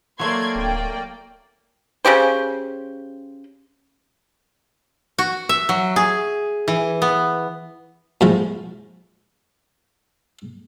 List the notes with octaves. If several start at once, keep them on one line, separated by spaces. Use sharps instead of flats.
F#3 A3 A#3 D5 C6 G#6
D1 G5
C#3 C#4 G4 C5
F#4
E5
F#3
G#4
E3
B3
A2 F3 G#3